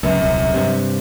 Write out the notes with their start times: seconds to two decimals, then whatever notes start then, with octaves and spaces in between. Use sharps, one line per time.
0.03 C#2 F#2
0.21 D#1 C2
0.54 G2 C3